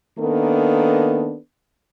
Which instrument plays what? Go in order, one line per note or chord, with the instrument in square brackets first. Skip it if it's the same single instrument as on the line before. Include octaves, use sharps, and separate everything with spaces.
[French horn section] D#3 A#3 B3 D4 A4